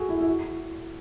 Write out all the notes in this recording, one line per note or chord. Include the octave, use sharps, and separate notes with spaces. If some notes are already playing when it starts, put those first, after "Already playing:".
Already playing: F#4 G#4 A4
E4
E4
F#4